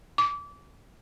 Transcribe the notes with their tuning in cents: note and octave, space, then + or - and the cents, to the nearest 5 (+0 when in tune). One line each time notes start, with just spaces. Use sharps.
D6 -25